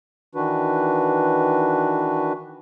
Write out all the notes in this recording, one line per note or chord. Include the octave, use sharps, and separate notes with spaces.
D#3 E3 D4 F#4 B4